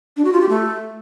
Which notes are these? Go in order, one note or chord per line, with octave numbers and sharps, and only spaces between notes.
D4
F#4
F4
G4
A3